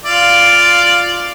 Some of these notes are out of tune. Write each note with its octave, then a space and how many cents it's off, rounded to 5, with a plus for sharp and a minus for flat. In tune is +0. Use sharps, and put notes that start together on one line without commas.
F4 -5 D5 +0 F5 +0